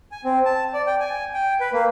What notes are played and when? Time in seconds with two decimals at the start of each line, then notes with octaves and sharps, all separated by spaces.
0.12 G#5
0.24 C4
0.45 A5
0.74 D5
0.87 G5
1.00 G#5
1.34 G5
1.61 B4
1.73 A#3